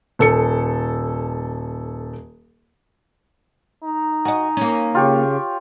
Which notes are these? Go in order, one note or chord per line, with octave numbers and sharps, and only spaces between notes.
D#1 A4 C#7
D#4
F#4 D#5 G#5
A#3 C#4
C#3 F4 G4 C#5